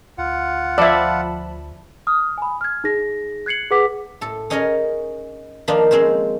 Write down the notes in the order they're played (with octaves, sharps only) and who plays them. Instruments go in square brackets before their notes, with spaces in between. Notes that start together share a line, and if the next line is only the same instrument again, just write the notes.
[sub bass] D2 [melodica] F4 F#5
[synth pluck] F3 A5 B5 [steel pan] D5 E5
[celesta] D#6 F6
G#5 B5
F6 G#6
D#4 G#4 A#6
F#6 G#6 C7 C#7 F#7
G#4 B4 F#5 D6 B6
[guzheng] A2 A4
C#4 D#4 G#4 A#4 C#5 D#5
D#3 F3 A#3 D4 D#4 F4
G#3 C4 C#4 C5